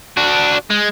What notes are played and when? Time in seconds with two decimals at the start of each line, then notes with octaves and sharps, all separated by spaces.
0.17 D4 F#4
0.71 G#3